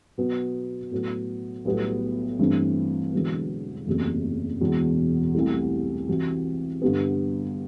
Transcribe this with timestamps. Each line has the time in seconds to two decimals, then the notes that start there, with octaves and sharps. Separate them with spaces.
0.18 B2 F#3 B3
0.91 A2 F#3 B3
1.65 B1 A2 G3 B3 F#4
2.39 G2 E3 A3 C4
3.12 E1 E2 D3 F#3 B3
3.87 F#1 E2 C3 F#3 A3
4.60 E1 E2 B2
5.34 C2 B2 A3 E4 G4
6.08 C3 E3 G3 C4 F#4
6.82 G2 D3 G3 B3